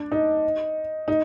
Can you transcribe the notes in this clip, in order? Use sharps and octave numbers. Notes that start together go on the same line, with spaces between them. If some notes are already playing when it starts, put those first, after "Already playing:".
Already playing: D4
D#4
D#4